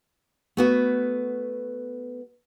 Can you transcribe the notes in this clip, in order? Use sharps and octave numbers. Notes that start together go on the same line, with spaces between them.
A3 B3 F#4